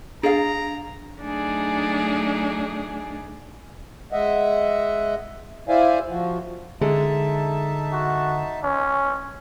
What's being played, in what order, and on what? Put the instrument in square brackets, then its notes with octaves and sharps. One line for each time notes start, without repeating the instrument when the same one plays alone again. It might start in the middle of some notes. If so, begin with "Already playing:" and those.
[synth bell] D4 [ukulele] G#4 D#5 F5 [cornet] A#5
[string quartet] F#3 A3 D4 D#4 G#4
[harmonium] G#3 D#5 E5 F#5
E4 C5 D5 E5 F5 G#5
F3 F4 F#4
[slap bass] D3 [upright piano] G#3 [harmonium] D#4 E5 A5
[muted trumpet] F#4
C#4